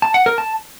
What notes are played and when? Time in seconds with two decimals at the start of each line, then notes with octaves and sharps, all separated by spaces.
0.02 A5
0.14 F#5
0.26 A#4
0.38 A5